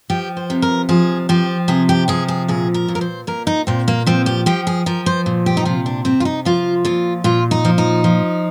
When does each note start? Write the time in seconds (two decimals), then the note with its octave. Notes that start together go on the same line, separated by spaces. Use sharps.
0.10 F3 G4
0.37 C5
0.50 C3
0.62 A#4
0.89 F3 G#4
1.29 F3 G4
1.68 C3 G#4
1.89 G4
2.08 F3 G#4
2.28 G#4
2.48 A#2 G#4
2.74 A#4
2.88 A#2
2.95 A#4
3.01 C5
3.27 A#2 A#4
3.47 D#4
3.67 A#2 C4
3.88 A#3
4.06 F3 C4
4.26 G4
4.46 F3 G4
4.67 G#4
4.86 F3 A#4
5.06 C5
5.26 A#2
5.46 G4
5.57 D#4
5.65 C3 F4
5.86 D4
6.05 C3 C4
6.20 F4
6.25 D#4
6.45 F3 F4
6.85 A#2 F4
7.24 A#2 F4
7.51 D#4
7.65 F3
7.78 D#4
8.04 F3